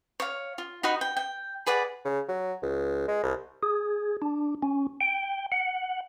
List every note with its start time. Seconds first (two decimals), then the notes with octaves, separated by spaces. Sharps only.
0.20 C#5 F5
0.58 F4
0.83 D#4 F#4 D#5 B5
1.01 G5
1.17 G5
1.66 G#4 B4 D5 F#5
2.05 C#3
2.28 F#3
2.63 C#2
3.08 G#3
3.23 C2
3.63 G#4
4.22 D4
4.63 C#4
5.01 G5
5.52 F#5